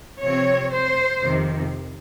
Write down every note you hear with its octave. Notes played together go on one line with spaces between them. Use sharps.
C3 F3 C4 C#5
C5
F2 C3 D#3